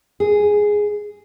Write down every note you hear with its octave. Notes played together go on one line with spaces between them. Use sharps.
G#4